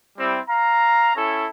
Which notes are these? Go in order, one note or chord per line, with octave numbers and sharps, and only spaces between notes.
G3 C4 E4
F5 A#5
C#4 E4 A4